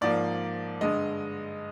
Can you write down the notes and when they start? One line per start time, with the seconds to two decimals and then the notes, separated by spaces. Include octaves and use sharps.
0.01 G#2 F3 A#3 D5
0.81 G2 D3 G#3 D#5